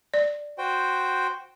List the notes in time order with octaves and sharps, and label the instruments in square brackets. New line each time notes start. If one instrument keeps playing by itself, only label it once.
[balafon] D5
[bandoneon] F#4 C5 G5